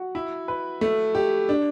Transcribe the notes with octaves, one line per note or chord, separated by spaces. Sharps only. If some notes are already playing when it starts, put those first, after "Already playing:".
Already playing: F#4
E4
B4
A3
G4
D4